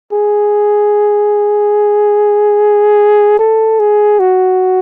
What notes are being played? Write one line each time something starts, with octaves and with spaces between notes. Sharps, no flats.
G#4
A4
G#4
F#4